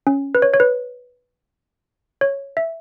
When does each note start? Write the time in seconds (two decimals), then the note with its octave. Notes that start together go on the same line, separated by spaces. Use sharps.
0.07 C#4
0.35 B4
0.42 C#5
0.54 C#5
0.60 B4
2.21 C#5
2.57 E5